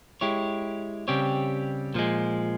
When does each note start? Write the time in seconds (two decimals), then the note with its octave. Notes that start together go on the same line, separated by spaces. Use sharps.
0.21 G#3 E4 G4 C#5
1.08 C#3 G3 C4 G4 C#5
1.95 A#2 F3 G#3